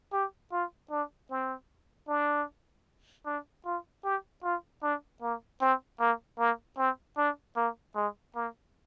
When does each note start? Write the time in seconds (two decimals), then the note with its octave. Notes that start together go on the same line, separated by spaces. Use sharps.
0.13 G4
0.52 F4
0.91 D4
1.30 C4
2.08 D4
3.26 D4
3.65 F4
4.04 G4
4.43 F4
4.83 D4
5.22 A#3
5.61 C4
6.00 A#3
6.39 A#3
6.78 C4
7.17 D4
7.56 A#3
7.96 G#3
8.36 A#3